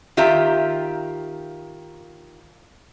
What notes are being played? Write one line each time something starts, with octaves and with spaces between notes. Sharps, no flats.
D#3 F4 G4 E5 A#5